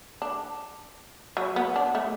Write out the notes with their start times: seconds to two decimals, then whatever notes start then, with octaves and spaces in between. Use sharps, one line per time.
0.22 D4
1.37 F#3
1.56 B3
1.76 D4
1.95 A3